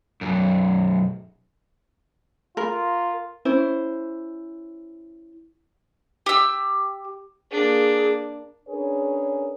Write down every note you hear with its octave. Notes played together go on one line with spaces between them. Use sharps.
B1 F#2
F4 A#4
C#4 E4 C5
G4 E6
A#3 D4 G#4
C#4 D4 G#4 A#4 B4 C#5